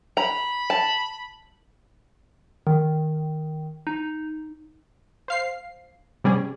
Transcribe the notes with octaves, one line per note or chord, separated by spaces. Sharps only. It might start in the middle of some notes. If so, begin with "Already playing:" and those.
A#5 B5
A5
D#3
D#4
C5 F5 C7
C3 G3 C#4 G#4